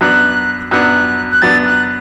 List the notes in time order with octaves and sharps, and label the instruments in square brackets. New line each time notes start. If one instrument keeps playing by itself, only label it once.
[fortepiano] F#2 F#3 B3 D4 [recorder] F#6
[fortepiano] F#2 F#3 B3 D4 [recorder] F#6
[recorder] F#6
[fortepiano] F#2 F#3 B3 D4 [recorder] A6
[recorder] F#6